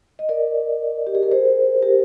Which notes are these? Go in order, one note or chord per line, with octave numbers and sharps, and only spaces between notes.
D#5
A#4 D5
G4
G#4
A#4
G#4 C5
G4 A#4